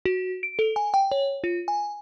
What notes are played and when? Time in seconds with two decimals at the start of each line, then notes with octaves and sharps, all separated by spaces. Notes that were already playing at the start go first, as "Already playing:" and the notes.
0.05 F#4
0.43 D7
0.59 A4
0.76 G#5
0.94 G5
1.12 C#5
1.44 F4
1.68 G#5